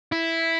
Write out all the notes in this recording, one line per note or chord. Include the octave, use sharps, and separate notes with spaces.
E4